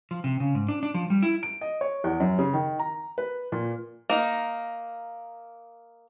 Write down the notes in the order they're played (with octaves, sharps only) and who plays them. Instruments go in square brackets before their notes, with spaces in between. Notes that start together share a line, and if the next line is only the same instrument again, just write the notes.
[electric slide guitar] F3
C3
C#3
G#2
D4
D4
F3
G3
E4
[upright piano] D7
D#5
C#5
E2
F#2
C#3
D#3
A#5
B4
A#2
[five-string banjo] A#3 D#4